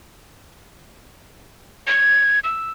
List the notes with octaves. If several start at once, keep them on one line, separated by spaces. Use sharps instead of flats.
G#6
E6